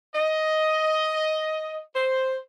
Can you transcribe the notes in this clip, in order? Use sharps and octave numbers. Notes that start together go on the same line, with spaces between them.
D#5
C5